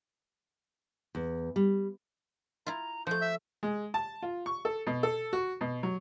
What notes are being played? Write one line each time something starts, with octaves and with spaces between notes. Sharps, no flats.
E2
G3
E4 F4 A#5
F3 A3 G6
E5 E6
G#3
A5
F4
C#6
A4
B2
A4
F#4
B2
F#3